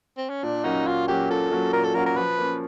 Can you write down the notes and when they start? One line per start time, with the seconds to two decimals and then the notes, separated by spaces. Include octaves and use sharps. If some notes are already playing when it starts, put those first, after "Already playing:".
0.17 C4
0.29 C#4
0.43 A#2 D4
0.64 F#3 A#3 C#4 D#4 F#4
0.87 A#2 F4
1.08 F#3 A#3 C#4 F#4 G4
1.30 A#2 A4
1.51 F#3 A#3 C#4 F#4
1.73 A#2 A#4
1.84 A4
1.94 F#3 A#3 C#4 F#4 A#4
2.06 A#4
2.16 F3 B4
2.38 A#3 C#4